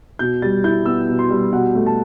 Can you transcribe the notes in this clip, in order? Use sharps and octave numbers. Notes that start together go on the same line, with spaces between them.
B2 G6
G3 A6
E4 G6
B3 E6
B2
C6
G3
B2 F#5
A3
A5